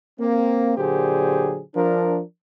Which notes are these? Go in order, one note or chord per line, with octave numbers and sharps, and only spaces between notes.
A#3 C4
A#2 D3 F#3 G4 G#4 C5
F3 D4 A#4